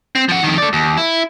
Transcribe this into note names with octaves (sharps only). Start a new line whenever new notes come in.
C4
F3 F#5
F2 D#3
A3 D5
D#2
E4